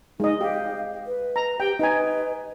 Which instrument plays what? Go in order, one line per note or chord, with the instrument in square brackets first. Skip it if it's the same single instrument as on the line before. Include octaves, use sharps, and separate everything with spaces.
[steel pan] G#3 D#5 [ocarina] D#4
[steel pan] G4 [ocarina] F5
[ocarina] B4
[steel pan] A#5
[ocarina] G4 [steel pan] G5
[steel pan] D#4 G#5 [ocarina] B4